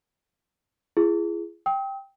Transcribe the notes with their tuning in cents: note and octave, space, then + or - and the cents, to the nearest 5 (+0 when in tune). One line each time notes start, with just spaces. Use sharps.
E4 +45 G#4 +0
G5 +0 D#6 +45